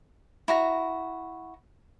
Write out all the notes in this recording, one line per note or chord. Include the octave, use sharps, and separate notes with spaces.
E4 F#4 A#5